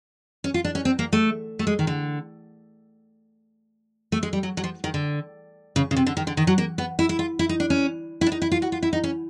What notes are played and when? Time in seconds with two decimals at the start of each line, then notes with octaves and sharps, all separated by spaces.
0.44 C#4
0.54 F4
0.64 D4
0.75 C#4
0.85 C4
0.99 A#3
1.13 A3
1.59 A3
1.67 G#3
1.79 D#3
1.87 D3
4.12 A3
4.23 G#3
4.33 G3
4.43 F#3
4.57 F#3
4.64 F3
4.84 D#3
4.94 D3
5.76 C#3
5.91 C#3
5.96 C3
6.07 D3
6.17 D#3
6.27 D3
6.37 D#3
6.47 F#3
6.58 A#3
6.78 B3
6.99 E4
7.09 E4
7.19 F4
7.39 E4
7.49 D#4
7.60 D4
7.70 C#4
8.21 E4
8.26 D4
8.32 D#4
8.42 E4
8.52 F4
8.62 F#4
8.72 F4
8.83 E4
8.93 D#4
9.04 C#4